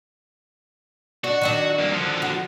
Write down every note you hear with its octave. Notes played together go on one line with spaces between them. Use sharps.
D4 F#4
D#3 F#3 D4
G2 A#3
D3 F3
F#4